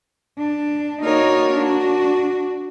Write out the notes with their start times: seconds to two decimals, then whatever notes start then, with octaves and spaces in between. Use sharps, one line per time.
0.37 D4
1.02 A#3 D#4 F#4 A#4 C#5 D5
1.53 D4 F#4